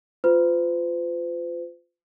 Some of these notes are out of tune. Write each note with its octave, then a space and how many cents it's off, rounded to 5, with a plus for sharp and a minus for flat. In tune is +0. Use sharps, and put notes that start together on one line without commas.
F4 +0 C5 -45